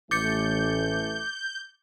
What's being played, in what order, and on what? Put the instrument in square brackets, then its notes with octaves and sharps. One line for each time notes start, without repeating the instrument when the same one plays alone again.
[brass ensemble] A1 [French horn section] E3 A3 [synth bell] D6 A6 C#7 [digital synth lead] G6